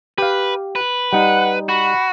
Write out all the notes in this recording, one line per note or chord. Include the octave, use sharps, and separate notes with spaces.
G4 B4 F5
B4
G3 D#4 F#5
F#4 B5